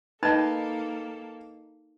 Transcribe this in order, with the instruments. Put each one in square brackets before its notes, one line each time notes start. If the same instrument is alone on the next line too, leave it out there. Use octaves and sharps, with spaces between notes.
[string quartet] A#3 A4 [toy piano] D#4 [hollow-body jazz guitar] B4 D#5 [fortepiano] G5 A5